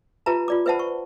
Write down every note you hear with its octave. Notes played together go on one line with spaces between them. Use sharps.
F4 G4 B4 E5 A5 A#5
F4 D5 D6
B4 C5 E5 F#5 A5 B5
C#6